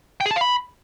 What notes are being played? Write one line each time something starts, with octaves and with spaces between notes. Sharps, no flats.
G5
G#4
A5
F5
B5